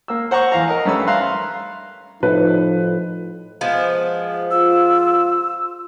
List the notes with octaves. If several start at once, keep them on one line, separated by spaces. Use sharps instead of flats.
A#3 E6
C5 F#5 A#5 C#6
E2 E3 F5 A#5
A#4 D#5
G2 A3 C#4 B4 B5 E6
E5 F5 A#5 C6 F#6
A2 F3 D#4 B4
F3 G#3 B3
F4 E6